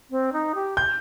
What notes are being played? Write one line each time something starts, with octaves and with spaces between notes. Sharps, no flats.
C4
D#4
G4
G6